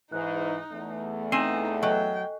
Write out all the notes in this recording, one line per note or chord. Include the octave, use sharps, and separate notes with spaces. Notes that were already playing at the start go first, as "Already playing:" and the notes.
G#2 E3 D#4 F#6
E2 A3
C4 D#4 G#5 C7 D#7 E7
F#3 A4 D#5 G5 G#5